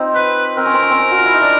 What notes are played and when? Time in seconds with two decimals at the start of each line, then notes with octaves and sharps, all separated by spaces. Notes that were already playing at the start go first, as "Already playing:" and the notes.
Already playing: C4 D#4 F4
0.15 B4
0.57 C4 A#4
0.66 C#4
0.74 C4
0.82 C#4
0.90 C4
0.99 C#4
1.11 F#4
1.18 F4
1.26 E4
1.34 D#4
1.41 D4